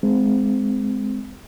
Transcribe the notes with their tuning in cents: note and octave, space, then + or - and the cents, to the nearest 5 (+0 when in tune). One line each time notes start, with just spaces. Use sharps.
G#3 +10 C4 -25